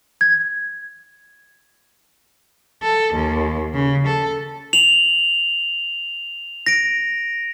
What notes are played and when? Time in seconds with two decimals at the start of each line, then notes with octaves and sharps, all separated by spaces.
0.21 G#6
2.83 A4
3.14 D#2
3.74 C#3
4.07 A4
4.73 F7 F#7
6.66 A#6 D7